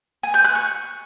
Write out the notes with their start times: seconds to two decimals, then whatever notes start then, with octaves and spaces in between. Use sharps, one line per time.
0.23 G#5
0.34 G6
0.45 F#6
0.55 C#6